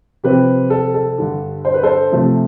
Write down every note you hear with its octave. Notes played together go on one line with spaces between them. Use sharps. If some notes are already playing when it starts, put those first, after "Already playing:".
C3 F3 C4 G4 B4
A4
A4
G2 D3 G3 D4
C5
B4
A4 C5
C3 F3 A3 C4